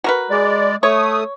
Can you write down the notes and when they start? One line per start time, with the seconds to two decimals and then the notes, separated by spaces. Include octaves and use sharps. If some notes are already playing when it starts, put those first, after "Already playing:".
0.04 F#4 A#4 B4
0.31 G#3 D5
0.83 A3 C#5 D#6